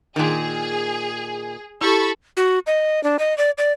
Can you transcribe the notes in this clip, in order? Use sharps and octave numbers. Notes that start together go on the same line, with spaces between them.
A#2 D#3 G#4
E4 G4 A4 A5 B5 C#6
F#4
D#5
D4
D#5
D5
D5